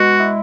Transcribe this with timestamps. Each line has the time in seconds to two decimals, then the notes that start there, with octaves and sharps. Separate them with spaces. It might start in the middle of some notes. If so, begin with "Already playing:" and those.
Already playing: B2 G#3 F#4
0.20 E4